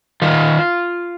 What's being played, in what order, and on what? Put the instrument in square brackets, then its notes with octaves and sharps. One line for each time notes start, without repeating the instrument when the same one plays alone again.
[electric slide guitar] D#3 F4